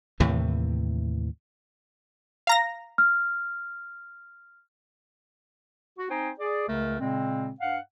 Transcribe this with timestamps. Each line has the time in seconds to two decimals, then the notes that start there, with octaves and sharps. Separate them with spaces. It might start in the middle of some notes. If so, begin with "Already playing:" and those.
0.20 D#2 A2 C3 E3
2.47 F5 A#5 A#6
2.98 F6
5.99 F#4
6.11 C4 D#4 C5 G5 G#5 A#5
6.40 G#4 D5
6.69 C#2 C#3 A3 A#4
7.00 A#2 C#3 G#3 C4
7.61 G2 F5 F#5